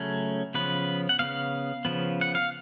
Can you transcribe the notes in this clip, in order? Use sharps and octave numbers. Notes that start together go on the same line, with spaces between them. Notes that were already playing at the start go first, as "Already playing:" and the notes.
Already playing: C#3 F#3 A3 C#4
C#3 F3 B3 B4
F#5
C#3 F3 B3 F5
C#3 F3 B3
F#5
F5